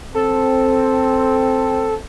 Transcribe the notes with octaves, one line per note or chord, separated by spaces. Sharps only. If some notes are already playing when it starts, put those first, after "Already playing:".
C4 A4